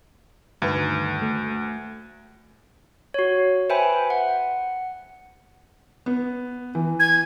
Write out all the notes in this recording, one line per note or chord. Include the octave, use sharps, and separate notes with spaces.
D2 G2 D#3 B4
A3
F#4 C#5
B4 C5 E5 G5 G#5 B5
F#5
B3
E3
G#6